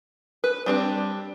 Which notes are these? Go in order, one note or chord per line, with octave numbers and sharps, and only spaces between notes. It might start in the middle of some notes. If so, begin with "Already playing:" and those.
B4
G3 C4 D4